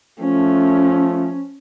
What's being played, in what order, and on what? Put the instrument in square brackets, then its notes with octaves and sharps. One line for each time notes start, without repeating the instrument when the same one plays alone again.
[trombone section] F3 A3 [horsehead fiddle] C#4